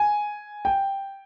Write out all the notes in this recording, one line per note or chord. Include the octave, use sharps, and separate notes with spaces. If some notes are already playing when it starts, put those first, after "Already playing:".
Already playing: G#5
G5